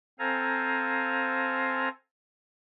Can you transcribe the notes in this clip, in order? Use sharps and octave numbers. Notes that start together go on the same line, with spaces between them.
C4 A4 C5 F5 G#5 A#5